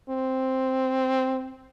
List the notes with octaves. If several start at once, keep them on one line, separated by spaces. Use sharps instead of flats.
C4